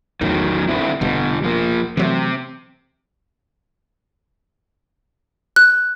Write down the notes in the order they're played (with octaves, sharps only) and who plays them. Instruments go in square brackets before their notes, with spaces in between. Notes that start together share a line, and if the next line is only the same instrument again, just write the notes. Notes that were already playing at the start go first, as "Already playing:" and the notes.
[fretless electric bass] A1 E2 A2 [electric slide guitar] D#3 F#3
[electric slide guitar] D3 C4 E4
[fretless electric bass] F1 B2 [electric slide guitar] D3 G3
[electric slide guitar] F3 A#3
[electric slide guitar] C3 [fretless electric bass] E3 F#3 A3
[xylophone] F#6